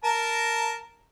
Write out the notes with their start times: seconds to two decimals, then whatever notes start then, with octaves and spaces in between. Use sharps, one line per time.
0.04 A#4 A5 A#5